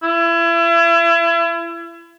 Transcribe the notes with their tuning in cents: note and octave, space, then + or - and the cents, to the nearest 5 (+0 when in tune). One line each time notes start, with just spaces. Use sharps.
E4 +35